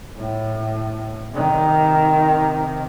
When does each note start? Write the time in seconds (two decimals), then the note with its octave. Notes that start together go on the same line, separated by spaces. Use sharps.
0.17 A2
1.31 C3 D#3